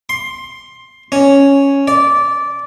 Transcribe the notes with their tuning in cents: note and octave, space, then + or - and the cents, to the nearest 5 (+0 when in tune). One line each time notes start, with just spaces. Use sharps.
C6 +15
C#4 +0
D5 -15